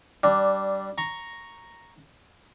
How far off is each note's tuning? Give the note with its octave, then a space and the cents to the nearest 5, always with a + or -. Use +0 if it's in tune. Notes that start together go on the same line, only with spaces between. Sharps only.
G3 -15 D4 +0
A#5 +0 C#6 +0